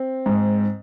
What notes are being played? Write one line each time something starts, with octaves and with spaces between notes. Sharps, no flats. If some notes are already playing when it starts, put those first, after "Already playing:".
Already playing: C4
G#2